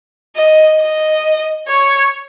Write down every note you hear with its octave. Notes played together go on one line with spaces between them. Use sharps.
D#5
D#5
C#5